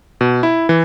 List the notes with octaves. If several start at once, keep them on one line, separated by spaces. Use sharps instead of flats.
B2
E4
E3